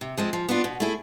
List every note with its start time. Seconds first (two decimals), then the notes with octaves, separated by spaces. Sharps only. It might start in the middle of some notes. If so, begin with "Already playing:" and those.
0.01 C3
0.17 F3 G#3 C4
0.33 F3
0.49 B3 D4 F4
0.64 B2
0.80 A3 E4 G#4